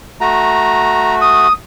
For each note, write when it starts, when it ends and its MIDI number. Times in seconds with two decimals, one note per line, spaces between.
0.21 1.47 57
0.21 1.47 66
0.21 1.15 82
1.21 1.53 87